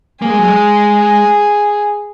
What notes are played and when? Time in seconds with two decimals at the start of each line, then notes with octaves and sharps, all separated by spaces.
0.22 A#3 G#4
0.30 G#3
0.39 F#3
0.48 G#3